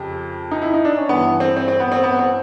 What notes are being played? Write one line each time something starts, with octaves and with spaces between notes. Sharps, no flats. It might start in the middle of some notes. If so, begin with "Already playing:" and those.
Already playing: F2 C#3 G4
D#4
E4
D#4
D4
C#4
G2 E3 B3
C4
C4
C4
B3
C4
B3
C4